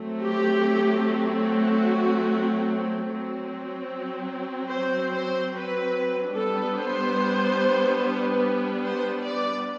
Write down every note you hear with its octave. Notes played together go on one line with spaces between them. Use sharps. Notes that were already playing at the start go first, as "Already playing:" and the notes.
Already playing: F#3 A3 C4
G4
F#4
F#3 C4
C5
C5
B4
G3 B3 D4 A4
C5
C5
D5